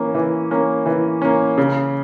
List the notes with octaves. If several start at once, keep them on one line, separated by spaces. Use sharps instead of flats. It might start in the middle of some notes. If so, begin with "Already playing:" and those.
Already playing: E3 A#3 C#4
E3
A#3 C#4
E3
A#3 C#4
C#3